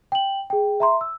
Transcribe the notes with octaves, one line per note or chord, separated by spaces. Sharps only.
G5 F#7
G#4 G5
E5 A#5 C6
E6